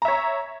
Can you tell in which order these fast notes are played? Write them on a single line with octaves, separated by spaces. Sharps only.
A#5 E5 C#5